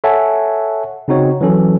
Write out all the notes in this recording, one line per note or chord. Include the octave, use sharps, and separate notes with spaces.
A4 C#5 E5 F#5 G#5 A5
C#3 C4 D#4 F#4 C#5
E3 F#3 C#4 A4